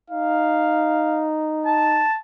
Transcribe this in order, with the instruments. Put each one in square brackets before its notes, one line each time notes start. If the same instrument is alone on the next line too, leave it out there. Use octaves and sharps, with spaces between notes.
[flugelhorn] D#4 [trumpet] F5
[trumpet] A5